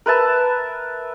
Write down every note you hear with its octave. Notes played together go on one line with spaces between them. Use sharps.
A#4 B4 E5 A5